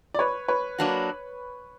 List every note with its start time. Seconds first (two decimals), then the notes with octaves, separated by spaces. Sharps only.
0.14 D5
0.19 B4 C#5
0.48 B4 C#5
0.78 F#3 A#3 D4 F#4